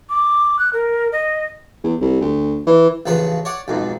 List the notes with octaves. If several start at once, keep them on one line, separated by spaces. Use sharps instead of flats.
D6
F#6
A#4
D#5
E2
C2
D2
E3
A1 C#3 F3 C#4 B4
C#5 D5 F#5
B1 F2 G#2